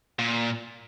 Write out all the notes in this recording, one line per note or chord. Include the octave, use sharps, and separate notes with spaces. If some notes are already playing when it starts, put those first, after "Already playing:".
A#2